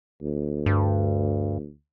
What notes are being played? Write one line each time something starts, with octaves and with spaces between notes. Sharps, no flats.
D2
G2